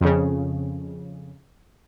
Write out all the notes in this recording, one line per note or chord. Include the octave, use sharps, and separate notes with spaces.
F2 C#3